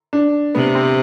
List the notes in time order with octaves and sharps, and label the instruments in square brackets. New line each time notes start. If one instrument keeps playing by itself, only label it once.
[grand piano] D4
[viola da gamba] C3 [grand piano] B3
[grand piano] C4